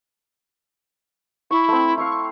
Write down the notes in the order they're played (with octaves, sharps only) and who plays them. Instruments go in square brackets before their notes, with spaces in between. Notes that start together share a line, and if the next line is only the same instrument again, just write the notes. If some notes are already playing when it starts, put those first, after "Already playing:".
[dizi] E4 [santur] C#6
[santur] A3 C4
[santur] E4 F5 [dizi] C#6